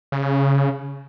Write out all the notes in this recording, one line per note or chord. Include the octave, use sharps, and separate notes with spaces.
C#3